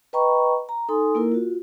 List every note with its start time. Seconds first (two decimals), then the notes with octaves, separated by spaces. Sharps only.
0.13 B4 D#5 G5 A#5 B5 C#6
0.69 A#5
0.89 D#4 A4 G#5 C6 D#6
1.15 A#3 E4 A#4
1.32 F4 F#4